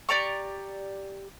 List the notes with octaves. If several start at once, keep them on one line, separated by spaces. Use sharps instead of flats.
G4 D5 A#5 C#6